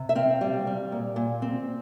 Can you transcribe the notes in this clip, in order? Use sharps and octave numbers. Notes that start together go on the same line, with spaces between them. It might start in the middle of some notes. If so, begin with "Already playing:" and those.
Already playing: C3
E5
C4 F5
G3
G3
A#2
A#2
C4